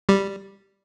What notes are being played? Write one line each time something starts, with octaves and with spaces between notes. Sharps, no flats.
G3